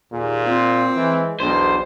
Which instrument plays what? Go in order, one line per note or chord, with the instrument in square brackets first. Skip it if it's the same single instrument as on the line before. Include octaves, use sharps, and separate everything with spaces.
[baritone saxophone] D#2 [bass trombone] A#2 [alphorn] G#4
[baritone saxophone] C4 [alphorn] F4
[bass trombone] E3 [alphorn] G#3
[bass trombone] B1 [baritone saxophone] E2 [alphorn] D4 [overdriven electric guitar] C5